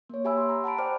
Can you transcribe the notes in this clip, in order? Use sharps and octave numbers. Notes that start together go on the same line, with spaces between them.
A#3 C#5
G4 E5 G#5 B5 E6
C6
A#5
F#5 A5 B5 D7
C5 D5 G5 D6 F6